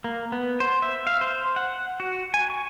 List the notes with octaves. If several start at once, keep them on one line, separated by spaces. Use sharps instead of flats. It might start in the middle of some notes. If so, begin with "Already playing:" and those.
A#3
B3
C5
E5
F5
C5
F#5
F#4
G#5
C#6